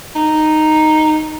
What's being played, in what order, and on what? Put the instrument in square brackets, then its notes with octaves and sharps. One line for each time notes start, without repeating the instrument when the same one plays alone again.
[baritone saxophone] D#4